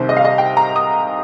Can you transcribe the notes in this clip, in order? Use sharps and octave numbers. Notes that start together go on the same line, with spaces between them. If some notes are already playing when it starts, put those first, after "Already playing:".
Already playing: C2 C3 D#3 C5
D#5
F5
D#5
G5
A#5
D#6